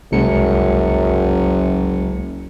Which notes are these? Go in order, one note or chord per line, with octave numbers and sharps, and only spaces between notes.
F#1 C2 F#2 G#3 C#7